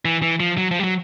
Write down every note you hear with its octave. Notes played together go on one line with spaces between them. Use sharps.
E3
E3
F3
F#3
F3
G3
F#3